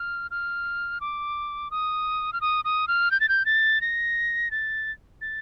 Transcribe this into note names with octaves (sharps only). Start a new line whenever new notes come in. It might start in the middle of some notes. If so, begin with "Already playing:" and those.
Already playing: F6
F6
D6
D#6
F6
D#6
D#6
F6
G6
A6
G6
A6
A#6
A6
A6